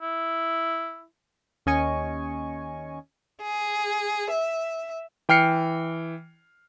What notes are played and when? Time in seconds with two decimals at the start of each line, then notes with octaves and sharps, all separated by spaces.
0.02 E4
1.66 D#2 C#4 D#5 G#5 C#6
3.42 G#4
4.31 E5
5.29 E3 G5 F6 C7 C#7